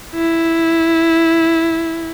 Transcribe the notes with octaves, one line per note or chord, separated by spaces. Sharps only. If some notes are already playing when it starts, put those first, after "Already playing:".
E4